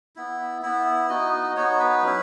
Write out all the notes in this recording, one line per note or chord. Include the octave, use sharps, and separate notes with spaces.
B3 E4
B3 E4
B3 D#4 F#4 D#5
B3 D#4 F#4 C#5
B4
F#3 C#4 E4